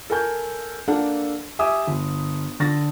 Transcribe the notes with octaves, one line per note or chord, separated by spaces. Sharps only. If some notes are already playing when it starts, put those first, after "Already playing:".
A4 A#4 G#5 G6
A#3 D4 A4 F#5
G4 E5 G#5 D6 D#6
G1
D3 A6 A#6